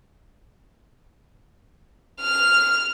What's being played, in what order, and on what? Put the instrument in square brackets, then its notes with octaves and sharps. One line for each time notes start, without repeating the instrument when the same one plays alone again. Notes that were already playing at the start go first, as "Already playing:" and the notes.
[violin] F6